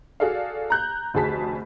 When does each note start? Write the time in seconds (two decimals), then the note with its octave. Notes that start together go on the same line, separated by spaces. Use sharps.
0.20 F#4 G#4 A4 D5 F5
0.70 A#5 F#6 G6
1.14 F1 D2 F#4 G#4 A5 B6